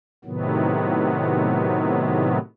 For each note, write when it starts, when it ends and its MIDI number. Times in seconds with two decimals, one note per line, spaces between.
0.25 2.39 45
0.25 2.39 48
0.25 2.39 51
0.25 2.39 54
0.25 2.39 59